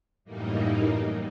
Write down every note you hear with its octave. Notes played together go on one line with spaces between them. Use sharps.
F#2 A2 E3 G3 A#3 D#4